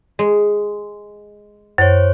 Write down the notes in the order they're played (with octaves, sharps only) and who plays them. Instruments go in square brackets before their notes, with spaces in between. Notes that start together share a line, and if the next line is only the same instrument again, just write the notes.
[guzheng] G#3
[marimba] F#2 [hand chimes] C5 C#5